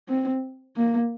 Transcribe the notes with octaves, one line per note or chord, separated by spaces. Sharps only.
C4
A#3